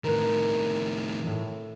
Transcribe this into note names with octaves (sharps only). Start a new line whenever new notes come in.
A2 D#3 A#4 B4 F#6
A2